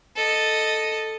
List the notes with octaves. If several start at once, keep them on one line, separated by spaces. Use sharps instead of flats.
A4 D#5